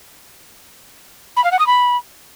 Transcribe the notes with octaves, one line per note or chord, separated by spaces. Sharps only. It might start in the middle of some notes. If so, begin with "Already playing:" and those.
B5
F5
F#5
D#6
B5